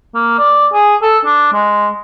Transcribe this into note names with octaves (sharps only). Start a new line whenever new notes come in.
A#3
D5
G#4
A4
D4
G#3